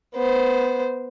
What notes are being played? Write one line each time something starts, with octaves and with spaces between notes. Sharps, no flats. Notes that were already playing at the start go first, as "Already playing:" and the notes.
B3 C5